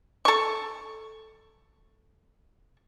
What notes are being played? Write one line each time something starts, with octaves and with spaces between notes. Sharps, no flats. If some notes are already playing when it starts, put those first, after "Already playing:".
A4 C#6